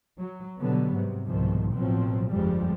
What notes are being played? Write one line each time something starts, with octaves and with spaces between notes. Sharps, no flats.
F#3
B2 D3 F#3 G3 B3
G#2 C3
C2 G#2 B2 D#3 F3
A1 B2 F3 F#3 C4
G1 F2 F3 G3 G#3